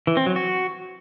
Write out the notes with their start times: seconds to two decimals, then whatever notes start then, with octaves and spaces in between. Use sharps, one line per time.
0.07 E3
0.17 C4
0.26 F#3
0.36 F#4